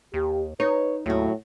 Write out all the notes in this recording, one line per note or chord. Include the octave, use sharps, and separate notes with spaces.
D#2 G4
D#4 B4 C#5
D#2 A2 F#3 F#4